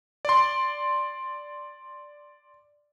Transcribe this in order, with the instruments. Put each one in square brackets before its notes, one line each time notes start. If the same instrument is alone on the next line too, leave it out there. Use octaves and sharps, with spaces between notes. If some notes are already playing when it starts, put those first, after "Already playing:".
[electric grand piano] D5 C6